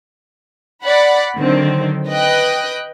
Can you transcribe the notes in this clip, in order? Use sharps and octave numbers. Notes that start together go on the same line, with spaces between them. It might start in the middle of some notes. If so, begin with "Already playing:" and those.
D5 F#5 B5
D3 D#3 F#3 C4
B4 D#5 G5 F#6